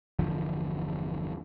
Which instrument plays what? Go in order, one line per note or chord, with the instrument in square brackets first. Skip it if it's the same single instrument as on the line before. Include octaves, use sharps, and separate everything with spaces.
[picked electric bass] G1 E2 D3 F3